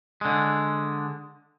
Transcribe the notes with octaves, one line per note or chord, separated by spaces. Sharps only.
D3 G#3